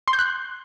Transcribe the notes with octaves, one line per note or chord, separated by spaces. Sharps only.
C6
G6
F#6